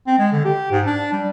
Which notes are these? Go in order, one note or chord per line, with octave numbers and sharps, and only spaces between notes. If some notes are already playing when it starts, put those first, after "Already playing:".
C4
G#3
D3
G4
G#2
D4
G3